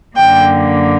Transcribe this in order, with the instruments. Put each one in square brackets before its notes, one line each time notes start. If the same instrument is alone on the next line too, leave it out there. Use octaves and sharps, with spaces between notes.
[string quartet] F#2 D3 A#3 G5